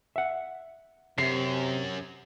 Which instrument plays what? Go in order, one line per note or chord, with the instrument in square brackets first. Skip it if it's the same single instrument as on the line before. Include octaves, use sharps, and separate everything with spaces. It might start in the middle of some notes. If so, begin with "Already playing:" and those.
[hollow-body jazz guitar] E5 F#5
[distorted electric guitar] F#2 [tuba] C3 [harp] C7